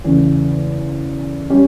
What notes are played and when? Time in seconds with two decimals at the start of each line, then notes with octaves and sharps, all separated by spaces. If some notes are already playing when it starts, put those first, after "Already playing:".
0.04 E2 C#3 E3 A3
1.50 G3 C#4 G4 C#5